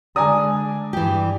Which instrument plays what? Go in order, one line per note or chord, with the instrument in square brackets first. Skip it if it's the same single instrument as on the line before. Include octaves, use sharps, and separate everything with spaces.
[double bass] D3 G#3 [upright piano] D5 [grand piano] G#5 A#5 D#6
[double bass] G2 [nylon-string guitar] E3 G4